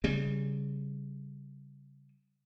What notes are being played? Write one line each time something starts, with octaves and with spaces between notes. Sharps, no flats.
C#3 G3